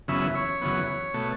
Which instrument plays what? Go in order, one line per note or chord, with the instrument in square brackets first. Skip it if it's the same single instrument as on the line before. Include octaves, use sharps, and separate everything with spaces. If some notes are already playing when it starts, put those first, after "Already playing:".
[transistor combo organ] F#2 C#3 E3 B3 E5
C#5
F#2 C#3 E3 B3
B2 A3